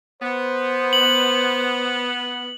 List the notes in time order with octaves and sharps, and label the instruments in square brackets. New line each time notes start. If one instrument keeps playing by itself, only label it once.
[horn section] B3 [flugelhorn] C5
[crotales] F#7